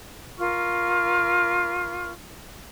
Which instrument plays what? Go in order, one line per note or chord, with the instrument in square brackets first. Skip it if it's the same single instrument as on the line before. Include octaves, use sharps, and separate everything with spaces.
[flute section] F4 A#4 C#6 F6